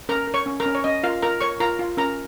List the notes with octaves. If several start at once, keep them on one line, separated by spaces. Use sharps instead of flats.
C#4 A#4 A#5
A#4
C#5 C#6
C#4
A#4 A#5
C#4
C#5
C#4 D#5
F4 A#4 F5
F4 A#4 A#5
A#4 C#5 C#6
F4 A#4 A#5
F4
C#4 A#4 A#5